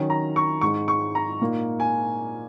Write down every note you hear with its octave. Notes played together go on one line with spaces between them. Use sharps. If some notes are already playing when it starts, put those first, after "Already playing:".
Already playing: D#3 F#3 C#4
A#5
C#6
G#2 G#3 D#4 C#6
C#6
A#5
A#2 A#3 D#4
G#5